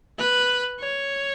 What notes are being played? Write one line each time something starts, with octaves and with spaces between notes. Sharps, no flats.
B4
C#5